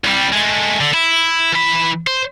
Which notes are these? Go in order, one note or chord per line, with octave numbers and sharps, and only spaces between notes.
C2 G3
G#3 A3
D3
E4
E3 B5
C5